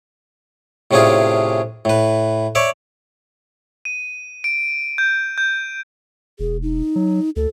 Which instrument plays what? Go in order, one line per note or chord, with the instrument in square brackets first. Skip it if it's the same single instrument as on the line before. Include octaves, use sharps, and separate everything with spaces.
[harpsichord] A2 C3 C#4 D4 F4 G#4
A2 B4
C#5 D5 E5
[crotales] D#7
D7
G6
G6
[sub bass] E1 [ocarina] G#4
[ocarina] D#4
[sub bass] F#3
[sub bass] D2 [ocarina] A4